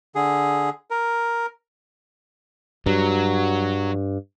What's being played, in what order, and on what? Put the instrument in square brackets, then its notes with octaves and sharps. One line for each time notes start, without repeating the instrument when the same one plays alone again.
[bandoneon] D3 G#4
A#4
[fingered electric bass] G2 [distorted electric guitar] F#3